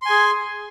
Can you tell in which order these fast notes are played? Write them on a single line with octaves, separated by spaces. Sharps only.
C6 G#5 G#4